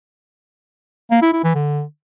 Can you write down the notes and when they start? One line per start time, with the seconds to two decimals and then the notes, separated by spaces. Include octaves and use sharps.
1.11 A#3
1.22 E4
1.33 E4
1.44 E3
1.55 D3